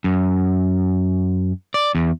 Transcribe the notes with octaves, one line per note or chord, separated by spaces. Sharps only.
F#2
D5
E2